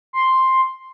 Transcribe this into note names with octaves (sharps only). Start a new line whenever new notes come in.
C6